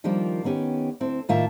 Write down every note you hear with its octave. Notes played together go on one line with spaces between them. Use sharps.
D#3 F3 G3 A#3 D4 F4
D#3 B3 C#4 G4
D2 C4 E4
A2 D#3 A#3 F4 E5 A5